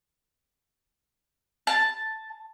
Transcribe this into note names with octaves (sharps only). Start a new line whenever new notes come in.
A5